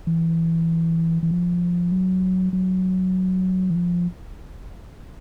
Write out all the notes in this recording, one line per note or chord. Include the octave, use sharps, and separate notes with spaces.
E3
E3
F3
F#3
F#3
E3
F3